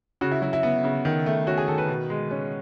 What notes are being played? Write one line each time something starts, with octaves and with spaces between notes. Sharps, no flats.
C#3 F#4
E4
F#3 E4
E4
B3
C#3
D#3
A3
C#4 F#4
G#4
D#3 A4
B4
B2
G#3
C#4